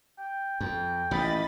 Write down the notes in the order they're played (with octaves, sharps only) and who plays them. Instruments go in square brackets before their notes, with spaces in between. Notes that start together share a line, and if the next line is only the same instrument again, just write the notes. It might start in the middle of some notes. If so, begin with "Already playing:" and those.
[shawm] G5
[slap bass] F2 [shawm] G5
[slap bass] A1 A#2 [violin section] D#5 B5 A6